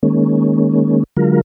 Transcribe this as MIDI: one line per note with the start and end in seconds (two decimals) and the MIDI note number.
0.03 1.03 51
0.03 1.03 56
0.03 1.03 58
0.03 1.03 61
1.17 1.41 50
1.17 1.41 54
1.17 1.41 56
1.17 1.41 65
1.17 1.41 70